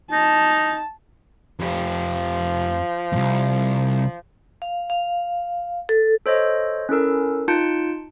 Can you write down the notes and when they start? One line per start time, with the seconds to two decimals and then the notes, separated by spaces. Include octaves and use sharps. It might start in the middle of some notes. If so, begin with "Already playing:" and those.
0.12 D#4 A5
1.59 F2 F3 G4
3.12 C2 F2
4.62 F5
4.90 F5
5.89 A4
6.26 A4 C5 C#5 D#5
6.89 C#4 E4 A4 A#4
7.48 D#4 F4 A5 G6 C#7 D7